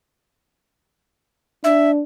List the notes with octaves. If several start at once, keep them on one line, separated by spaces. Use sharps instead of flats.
D4 E5